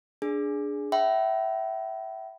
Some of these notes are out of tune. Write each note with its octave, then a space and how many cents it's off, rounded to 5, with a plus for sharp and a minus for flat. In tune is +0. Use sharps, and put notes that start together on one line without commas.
D4 -5 G#4 +0
E5 +0 G5 -40 B5 +0